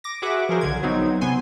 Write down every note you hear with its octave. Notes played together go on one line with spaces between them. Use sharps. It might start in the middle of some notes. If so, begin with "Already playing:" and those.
D6 A#6
F#4 G#4 B4 E5 F#5 D6
F3 C#4 G#4 A#4 C5
B1 D3 G#6
F#3 B3 C4 D#4
C3 B3 G#5 C6